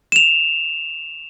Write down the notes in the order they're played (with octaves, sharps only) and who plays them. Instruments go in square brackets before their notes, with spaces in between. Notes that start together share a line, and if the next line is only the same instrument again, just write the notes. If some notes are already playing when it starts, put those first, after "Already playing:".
[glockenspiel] E7 F7